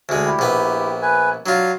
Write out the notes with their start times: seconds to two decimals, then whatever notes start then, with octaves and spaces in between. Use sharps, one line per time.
0.09 D2 G#3
0.26 E4 G4
0.39 A#1 B3
1.02 B4 G#5
1.46 F#3 D4 F4